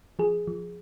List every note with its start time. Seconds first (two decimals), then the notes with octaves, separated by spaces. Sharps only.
0.19 F3 G#4
0.47 F3